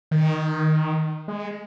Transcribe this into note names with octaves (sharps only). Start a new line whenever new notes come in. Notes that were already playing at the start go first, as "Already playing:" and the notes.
D#3
G#3